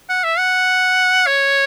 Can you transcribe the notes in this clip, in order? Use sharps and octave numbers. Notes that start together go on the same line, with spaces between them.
F#5
E5
F#5
C#5